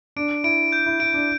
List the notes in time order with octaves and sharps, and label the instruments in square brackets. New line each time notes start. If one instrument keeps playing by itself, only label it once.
[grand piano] D4 [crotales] D7
[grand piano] E4 [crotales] D7
[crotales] G6
[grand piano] E4
[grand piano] E4 [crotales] D7
[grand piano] D4